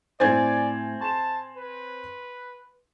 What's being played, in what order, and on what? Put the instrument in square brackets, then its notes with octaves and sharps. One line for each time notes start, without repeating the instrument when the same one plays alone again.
[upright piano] A2 A6 [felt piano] C4 G#5 G#6 [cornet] D5
[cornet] A5 [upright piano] C6 E7
[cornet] B4